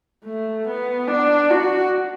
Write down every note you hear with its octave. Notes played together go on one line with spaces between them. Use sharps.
A3
B3
D4
F#4